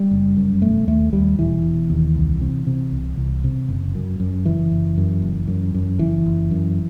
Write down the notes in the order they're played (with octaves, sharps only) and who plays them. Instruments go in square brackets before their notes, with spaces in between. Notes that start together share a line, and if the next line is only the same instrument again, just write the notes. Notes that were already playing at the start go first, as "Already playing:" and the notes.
Already playing: [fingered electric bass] G3
F#1
F#2
E1 A3
D#2 A3
D#2 G3
E1 E3
E1
D#2
C2
C3
C3
C2
C2
C3
F#1
F#2
F#2
F#1 E3
F#1
F#2
F#1
F#2
F#2
F#1 E3
F#1
F#2